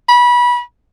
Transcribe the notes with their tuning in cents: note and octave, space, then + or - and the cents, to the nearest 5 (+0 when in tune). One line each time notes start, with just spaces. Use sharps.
B5 -25